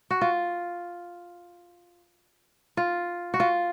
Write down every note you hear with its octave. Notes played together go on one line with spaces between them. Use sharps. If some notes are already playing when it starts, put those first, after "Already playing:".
F#4
F4
F4
F#4
F4